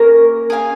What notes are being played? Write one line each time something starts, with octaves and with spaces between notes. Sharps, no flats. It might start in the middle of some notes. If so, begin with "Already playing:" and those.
Already playing: A#3 C#4 A#4
G#4 F5 G#5